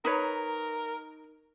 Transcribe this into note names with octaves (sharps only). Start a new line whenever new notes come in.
D#4 A#4 B4 C#5